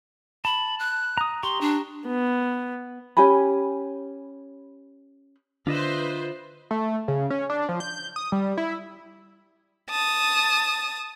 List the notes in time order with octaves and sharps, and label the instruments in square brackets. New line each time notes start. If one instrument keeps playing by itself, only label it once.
[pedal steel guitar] A5 [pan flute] B5
[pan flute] F#6
[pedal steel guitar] A#5 D#6
[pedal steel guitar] G4 A#5 C#6 [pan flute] C6
[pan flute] D4
[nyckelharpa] B3
[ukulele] C#4 G4 G#5 B5
[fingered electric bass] D3 [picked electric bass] D4 [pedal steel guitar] F4 D#5 E5 [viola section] B4 C5
[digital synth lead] A3
C#3
C#4
D4
F3
G6
D#6
G3
E4
[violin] A5 D#6